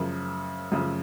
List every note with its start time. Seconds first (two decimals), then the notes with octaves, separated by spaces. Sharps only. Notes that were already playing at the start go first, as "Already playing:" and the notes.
Already playing: F#2 C#3 F3 A#4
0.72 F#2 C#3 F3